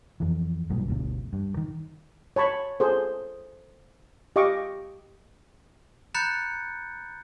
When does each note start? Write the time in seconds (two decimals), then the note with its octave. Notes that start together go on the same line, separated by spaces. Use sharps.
0.20 F2 E3
0.70 B1 G2 A#2
0.88 G1 D2 B2
1.33 G2
1.57 D#3
2.36 C#5 A5 B5 C#6
2.80 G#4 A4 C5
4.36 G4 D#5 F5 C#6 D6
6.15 A#5 B5 F#6 G6 A6 C#7